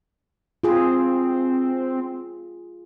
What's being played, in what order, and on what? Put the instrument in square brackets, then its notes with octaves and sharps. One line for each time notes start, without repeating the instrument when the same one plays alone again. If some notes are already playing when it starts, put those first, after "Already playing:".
[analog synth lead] C4 [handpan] F4 G#4